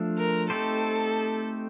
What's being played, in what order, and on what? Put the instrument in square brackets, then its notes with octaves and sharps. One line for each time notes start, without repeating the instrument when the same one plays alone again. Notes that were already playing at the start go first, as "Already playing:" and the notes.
Already playing: [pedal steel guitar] F3 A3 D4
[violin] A#4
[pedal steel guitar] A3 C4 D#4 G4 C5 [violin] A4